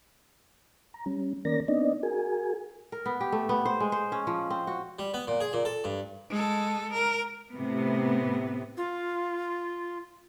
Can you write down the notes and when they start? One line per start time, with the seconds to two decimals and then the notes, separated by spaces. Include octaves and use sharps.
0.94 A#5
1.06 G3 C#4
1.45 D#3 A#3 C#4 A#4 D5 A#6
1.68 B3 C4 D4 D#4 D5 D#5
2.03 F#4 G#4 A#4 G#5
2.92 A#4
3.06 B3
3.21 G4
3.32 A3
3.49 B3
3.65 C5
3.80 G#3
3.92 C5
4.12 C#4
4.27 F3
4.50 C4
4.67 F#4
4.99 G3
5.14 B3
5.28 A#2
5.41 G#4
5.53 A#2
5.65 A4
5.84 G2
6.30 G#3 A4
6.93 A#4
7.54 A2 C3 B3
8.77 F4